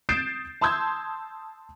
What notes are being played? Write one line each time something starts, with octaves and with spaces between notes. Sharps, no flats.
D#6 G6 A6 C7 D7 E7
A5 C6 D#6 E6 G6 G#6